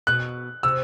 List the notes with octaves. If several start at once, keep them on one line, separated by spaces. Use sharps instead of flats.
B2 F#6
C3 E6